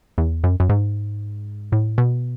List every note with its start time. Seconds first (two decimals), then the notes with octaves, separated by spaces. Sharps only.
0.18 E2
0.44 F#2
0.60 F#2
0.69 G#2
1.72 A2
1.98 B2